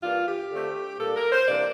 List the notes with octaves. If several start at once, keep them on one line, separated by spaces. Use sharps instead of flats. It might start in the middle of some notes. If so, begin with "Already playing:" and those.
G2 E3 A#3 D4 F4
G4
D3 A3 C4
A#2 G3 A#3 D4 A4
A#4
C5
C3 E3 A#3 D4 D5